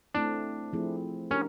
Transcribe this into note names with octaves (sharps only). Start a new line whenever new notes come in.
A3 C4 D4 E4
F3 A3 C4 E4 G#4
C#4 D4 G4 A#4